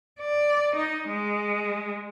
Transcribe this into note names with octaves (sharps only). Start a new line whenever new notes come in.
D5
D#4
G#3